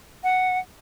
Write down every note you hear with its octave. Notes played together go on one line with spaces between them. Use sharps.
F#5